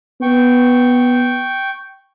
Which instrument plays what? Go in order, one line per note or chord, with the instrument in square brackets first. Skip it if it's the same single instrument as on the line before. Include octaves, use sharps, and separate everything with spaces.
[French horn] B3 [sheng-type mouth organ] G5 C#6